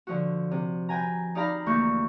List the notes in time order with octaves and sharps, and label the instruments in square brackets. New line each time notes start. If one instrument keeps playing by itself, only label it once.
[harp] D3 F3 F#4
C3
B4 G5 G#5 A#5
D#4 G4 D5 F5 A#5 B5
D2 E3 A#3 F#4 C#6 G6